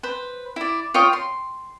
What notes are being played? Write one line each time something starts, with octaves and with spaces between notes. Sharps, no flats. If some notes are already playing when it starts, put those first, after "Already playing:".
B4 C5
E4 D5
F4 C#5 G5 D#6
C6